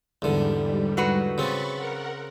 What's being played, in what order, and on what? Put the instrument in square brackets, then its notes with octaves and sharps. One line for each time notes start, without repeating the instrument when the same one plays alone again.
[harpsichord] E2 D3 [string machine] G#2 G3
[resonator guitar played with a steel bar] F#3 F#4 B4
[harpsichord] C#3 C4 [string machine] B5 C#6 A6
[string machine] A#4 F#5